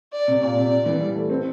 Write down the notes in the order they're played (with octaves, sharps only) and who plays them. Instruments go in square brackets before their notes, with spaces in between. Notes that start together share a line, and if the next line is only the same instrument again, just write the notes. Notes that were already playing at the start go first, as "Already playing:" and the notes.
[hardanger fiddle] D5
[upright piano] C3
[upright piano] A#2 [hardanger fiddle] D5
[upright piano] C3
E3
G3
A3
C4